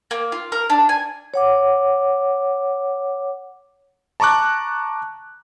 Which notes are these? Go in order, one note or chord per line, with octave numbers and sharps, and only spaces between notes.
A#3
F4
A#4
D4
G#5
C#5 F#5 D6
A5 A#5 C#6 D6 F#6